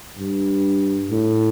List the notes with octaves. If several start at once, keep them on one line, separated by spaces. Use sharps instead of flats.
G2
A2